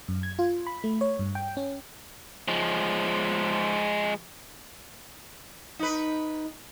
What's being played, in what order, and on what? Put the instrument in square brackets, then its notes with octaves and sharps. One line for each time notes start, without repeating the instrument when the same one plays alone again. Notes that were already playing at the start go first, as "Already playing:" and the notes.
[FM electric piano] F#2
G#6
F4
B5
A3
C#5
G2
G5
C#4
[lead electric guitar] F3 G#3
[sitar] D#4 B4